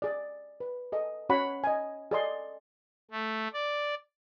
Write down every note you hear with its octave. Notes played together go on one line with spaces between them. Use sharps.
G#4 D5
B4
G#4 A4 D#5
C#4 F#4 C#5 F#5 B5
D#5 G#5
G#4 A4 D5 D#5 G#5 C6
A3
D5